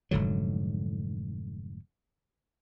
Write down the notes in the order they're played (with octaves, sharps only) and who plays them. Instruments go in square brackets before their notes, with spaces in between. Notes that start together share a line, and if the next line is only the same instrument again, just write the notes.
[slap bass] F1 G#2 D3 F#3